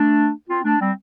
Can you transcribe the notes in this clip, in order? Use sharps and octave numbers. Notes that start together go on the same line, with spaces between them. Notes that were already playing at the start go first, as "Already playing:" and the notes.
Already playing: A3 D4
C4 F4
A3 D4
G3 C4